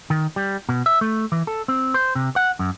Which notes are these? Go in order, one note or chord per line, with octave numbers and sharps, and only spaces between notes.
D#3
G3
B2
E5
A3
E3
A4
C4
C5
C3
F#5
F#2